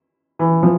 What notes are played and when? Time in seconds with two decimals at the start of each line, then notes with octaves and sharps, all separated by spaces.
0.39 E3
0.63 F3